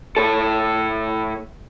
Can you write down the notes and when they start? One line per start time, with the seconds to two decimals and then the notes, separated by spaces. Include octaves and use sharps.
0.17 A2 A4